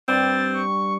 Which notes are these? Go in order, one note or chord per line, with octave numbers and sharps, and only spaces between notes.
G2 G3 C4 A6
C#6